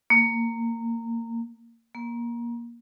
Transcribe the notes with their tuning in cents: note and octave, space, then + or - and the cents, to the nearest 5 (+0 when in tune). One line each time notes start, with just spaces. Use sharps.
A#3 -20
A#3 +20